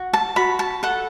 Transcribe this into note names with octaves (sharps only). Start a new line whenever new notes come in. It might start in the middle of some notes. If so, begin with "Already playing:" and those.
Already playing: F#4
A5
F#4 B5
A5
A4 F#5